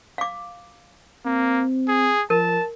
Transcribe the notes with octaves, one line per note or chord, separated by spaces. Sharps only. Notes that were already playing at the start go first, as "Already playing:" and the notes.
F5 D6
A#3 C4
G#4
F3 A#4 A5